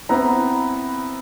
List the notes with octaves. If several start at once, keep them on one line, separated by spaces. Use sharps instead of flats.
B3 C4 E4 B4 A#5